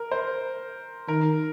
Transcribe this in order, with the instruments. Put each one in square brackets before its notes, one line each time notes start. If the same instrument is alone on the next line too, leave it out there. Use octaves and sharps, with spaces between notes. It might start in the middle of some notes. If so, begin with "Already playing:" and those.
Already playing: [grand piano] A#4
C5
[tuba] D#3 [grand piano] A#4